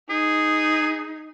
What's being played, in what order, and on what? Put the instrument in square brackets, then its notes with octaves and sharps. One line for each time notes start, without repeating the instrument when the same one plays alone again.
[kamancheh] D#4 [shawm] G#4